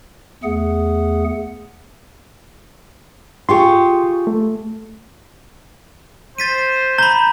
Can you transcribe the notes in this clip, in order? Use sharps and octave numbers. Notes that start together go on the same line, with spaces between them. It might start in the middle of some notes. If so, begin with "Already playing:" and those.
E2 A3 G#4 F#5
F4 G4 G#4 C6 C#6
A3
C5 A6 B6 D#7
A#5 B5 G6